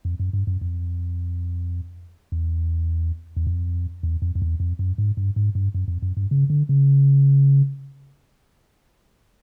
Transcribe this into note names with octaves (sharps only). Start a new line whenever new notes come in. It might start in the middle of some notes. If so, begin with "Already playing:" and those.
F2
F#2
G2
F#2
F2
E2
E2
F2
E2
F2
F2
E2
F2
F#2
G#2
G2
G#2
G2
F#2
F2
F#2
G2
C#3
D3
C#3